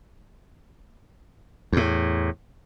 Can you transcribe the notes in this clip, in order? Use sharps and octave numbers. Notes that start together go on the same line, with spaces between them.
E2 A2